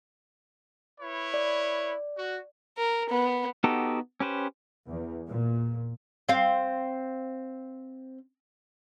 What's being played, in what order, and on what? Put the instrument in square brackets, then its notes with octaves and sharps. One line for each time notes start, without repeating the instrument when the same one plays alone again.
[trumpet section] E4 B4 C#5
[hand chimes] D5
[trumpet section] F#4
[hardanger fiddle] A#4
B3
[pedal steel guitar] B3 D#4 F#4 G4 A4
C#4 G4 B4 C5
[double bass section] E2
A#2
[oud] C4 F5